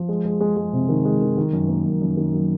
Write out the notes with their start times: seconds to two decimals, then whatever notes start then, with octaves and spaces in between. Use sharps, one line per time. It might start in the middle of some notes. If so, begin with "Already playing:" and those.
Already playing: F3
0.09 G#3
0.25 G#3
0.40 G#3
0.57 G#3
0.73 C3
0.89 D#3
1.05 G#3
1.21 D#3
1.37 D#3
1.53 F#2
1.68 A#3
1.86 F#2
2.01 F#2
2.17 D#3
2.33 F#3